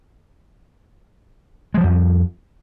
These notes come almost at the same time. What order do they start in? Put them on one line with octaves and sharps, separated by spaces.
G#3 F3 G3 F2